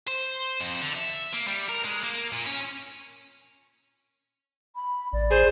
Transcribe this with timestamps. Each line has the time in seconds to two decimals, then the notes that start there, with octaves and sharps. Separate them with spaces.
0.07 C5
0.61 F2
0.82 D3
0.95 E5
1.33 A#3
1.47 G3
1.69 A#4
1.85 G#3
2.03 A#3
2.33 A#2
2.47 C#4
4.75 B5
5.13 A1 D5
5.31 G#4 C5